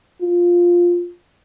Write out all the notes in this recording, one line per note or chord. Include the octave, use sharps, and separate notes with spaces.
F4